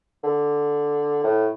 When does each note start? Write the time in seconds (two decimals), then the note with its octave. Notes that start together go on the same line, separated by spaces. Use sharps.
0.23 D3
1.24 A2